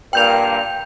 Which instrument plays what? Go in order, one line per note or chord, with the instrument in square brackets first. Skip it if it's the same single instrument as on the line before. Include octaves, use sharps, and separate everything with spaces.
[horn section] G2 A#2 [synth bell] G5 G6 F7